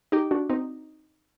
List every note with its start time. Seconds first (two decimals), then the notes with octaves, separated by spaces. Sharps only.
0.12 D#4 G4
0.31 D4 F#4
0.50 C4 D#4